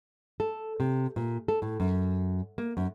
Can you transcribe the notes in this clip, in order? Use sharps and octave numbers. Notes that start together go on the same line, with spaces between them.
A4
C3
A#2
A4
A2
F#2
A#3
F#2